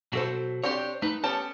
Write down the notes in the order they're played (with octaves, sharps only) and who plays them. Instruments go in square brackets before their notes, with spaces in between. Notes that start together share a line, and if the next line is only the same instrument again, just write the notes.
[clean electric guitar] B2 F#3 [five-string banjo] F#4 A4 C5
[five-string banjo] C4 D4 G4 [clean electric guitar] C5 C#5
[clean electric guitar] A3 B4 [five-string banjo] D#4
[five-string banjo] B3 C#4 A5 [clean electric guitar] G4 A4